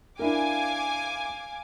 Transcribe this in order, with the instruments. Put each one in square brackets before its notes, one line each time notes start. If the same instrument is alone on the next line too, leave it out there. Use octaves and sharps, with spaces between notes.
[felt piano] D4 E4 A#4 [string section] F5 G#5 D6